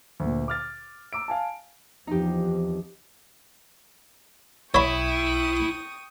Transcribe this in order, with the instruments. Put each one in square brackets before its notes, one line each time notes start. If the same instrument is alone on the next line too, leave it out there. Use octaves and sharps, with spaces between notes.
[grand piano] D2 A#2
D6 F6 A6
A#5 D6 E6 D7
F5 G#5 A5
[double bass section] E2 F3 C4 [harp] D#4 G4
[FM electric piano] B1 [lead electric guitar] E4 [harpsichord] C#5 B5 [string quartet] G5 C#6 D#6